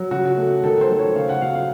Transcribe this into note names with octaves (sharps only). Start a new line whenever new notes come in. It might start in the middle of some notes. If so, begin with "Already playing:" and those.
Already playing: F#3
C#3 F#4
A3
D#3 A4
C5
F#3
C#5
C#3 F5
F#5
F#3 F5
F5